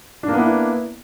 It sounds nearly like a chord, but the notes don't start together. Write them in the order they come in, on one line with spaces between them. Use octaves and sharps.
D4 A#3 B3 E4